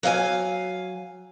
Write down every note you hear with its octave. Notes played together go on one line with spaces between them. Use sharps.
F#3 F5 G5 G#5